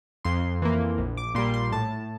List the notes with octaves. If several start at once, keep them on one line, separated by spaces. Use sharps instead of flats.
F2 C6
E3 A#3
A#1
D6
A#2 G3 C6
C6
A2 A5